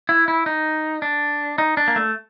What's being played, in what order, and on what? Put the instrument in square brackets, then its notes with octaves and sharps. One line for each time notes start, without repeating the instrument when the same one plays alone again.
[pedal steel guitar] E4
E4
D#4
D4
D#4
D4
A#3
A3